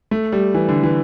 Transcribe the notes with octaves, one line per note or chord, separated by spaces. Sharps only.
A3
G3
E3
D3
E3